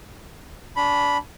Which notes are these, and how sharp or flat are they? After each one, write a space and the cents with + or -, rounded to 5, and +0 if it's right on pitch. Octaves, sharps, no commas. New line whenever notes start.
D4 -20 B5 +0